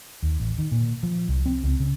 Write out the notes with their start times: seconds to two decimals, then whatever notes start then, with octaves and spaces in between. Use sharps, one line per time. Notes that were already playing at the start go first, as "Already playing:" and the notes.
0.22 D#2
0.40 A1
0.58 D#3
0.71 A#2
1.03 F3
1.29 C2
1.45 C4
1.63 C#2
1.80 C#3